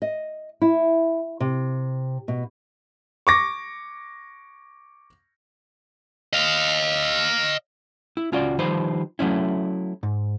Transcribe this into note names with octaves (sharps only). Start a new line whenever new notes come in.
D#5
E4
C3
B2
C#6 D6 A#6
D#5 F5
E4
C#2 C#4 F4 F#4 D5
D#3 F3 G3 D#4 B4 C5
F#3 A3 C#4 E4
G#2